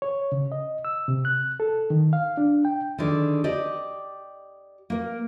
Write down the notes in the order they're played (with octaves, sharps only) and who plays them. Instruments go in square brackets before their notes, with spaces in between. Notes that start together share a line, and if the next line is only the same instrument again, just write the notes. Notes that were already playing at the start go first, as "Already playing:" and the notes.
[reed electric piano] C#5
C#3
D#5
E6
C3
F#6
A4
D#3
F5
D4
G5
[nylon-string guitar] D3 D#3 G#4 D5
G4 D5 D#5
A#3 A#4